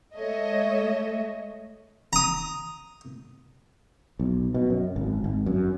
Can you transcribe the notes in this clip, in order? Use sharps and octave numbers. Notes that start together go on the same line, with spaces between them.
G#3 A3 C#5 D#5 E5
A#5 D#6
B1
B2
F#2
G#1
G#1
F#2